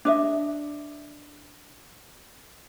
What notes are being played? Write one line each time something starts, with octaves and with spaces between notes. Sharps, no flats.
D4 D#5 E5